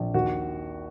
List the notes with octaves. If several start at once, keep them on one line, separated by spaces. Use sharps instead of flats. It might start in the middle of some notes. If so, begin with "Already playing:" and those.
Already playing: A#1
D#2 F#4